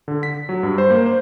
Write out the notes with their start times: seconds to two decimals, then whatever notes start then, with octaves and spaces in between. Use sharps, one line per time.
0.08 D3
0.23 B6
0.49 F#3
0.63 G2
0.78 C5
0.91 A#3
1.06 C5